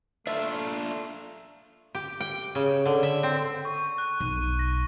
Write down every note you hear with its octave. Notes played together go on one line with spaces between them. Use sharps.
A3 D4 F4 E5
G4
G5
C#3
D3
E5
C4
C#6
F#6
B1 D#7
A#6